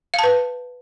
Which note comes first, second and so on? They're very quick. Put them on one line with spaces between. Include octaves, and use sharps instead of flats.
F5 A5 B4